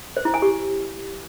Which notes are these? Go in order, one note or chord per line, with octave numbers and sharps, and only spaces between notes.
C5
E4
G#5
G4